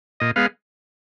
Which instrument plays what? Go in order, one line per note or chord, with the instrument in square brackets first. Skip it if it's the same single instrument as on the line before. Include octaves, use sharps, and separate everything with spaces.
[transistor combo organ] A#2 D#5
G#3 B3 F5